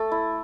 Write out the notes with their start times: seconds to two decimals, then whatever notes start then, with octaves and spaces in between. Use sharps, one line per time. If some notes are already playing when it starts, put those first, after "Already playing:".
Already playing: A3 A4
0.11 E4